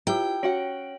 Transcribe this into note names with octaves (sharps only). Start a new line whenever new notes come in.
E4 F4 G4 G5 A#5
C#4 F#4 C#5 F#5 D7 F#7